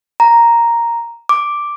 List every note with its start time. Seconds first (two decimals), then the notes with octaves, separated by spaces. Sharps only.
0.20 A#5
1.29 D6